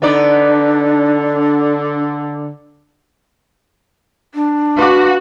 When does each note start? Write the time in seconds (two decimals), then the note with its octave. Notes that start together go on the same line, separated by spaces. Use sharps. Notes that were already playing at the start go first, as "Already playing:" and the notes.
0.02 D3 B3 D4 D#4 D5
4.35 D4
4.79 F#4 B4 F5 D6